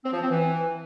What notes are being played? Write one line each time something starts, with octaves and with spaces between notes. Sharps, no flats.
C4
F3
C4
E3